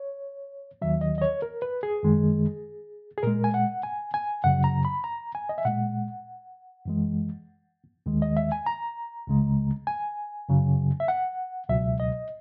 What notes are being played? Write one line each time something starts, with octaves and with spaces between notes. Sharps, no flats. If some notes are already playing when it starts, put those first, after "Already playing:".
Already playing: C#5
D#2 D#3 F#3 E5
D#5
D#5
C#5
A#4
B4
G#4
F#2 D#3 G#3
G#4
A#2 G#3 A#4
G#5
F#5
G#5
G#5
F#2 C#3 F#3 F#5
A#5
B5
A#5
G#5
D#5
E5
A#2 G#3 F#5
F#2 E3 G#3
D#2 D#3 G#3
D#5
E5
G#5
A#5
C#2 C#3 G#3
G#5
F#2 C#3 F#3
E5
F#5
C#2 B2 F#3 E5
D#5